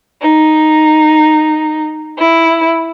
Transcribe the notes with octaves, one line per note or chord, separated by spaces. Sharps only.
D#4
E4